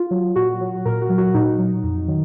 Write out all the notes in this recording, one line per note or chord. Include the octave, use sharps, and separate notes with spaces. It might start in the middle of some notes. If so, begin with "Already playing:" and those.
Already playing: F4
F#3
A#2 F#4
F#3
A#2 A#4
F#4
F#3
F#4
A#2 D#4
F#3
F2
D#3 F#3